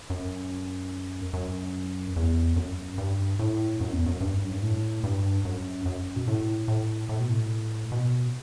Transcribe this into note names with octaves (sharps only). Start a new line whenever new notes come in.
F#2
F#2
E2
F#2
G2
A2
F#2
E2
F#2
G2
F#2
G2
A2
G2
F#2
F#2
B2
A2
A2
A2
B2
A2
B2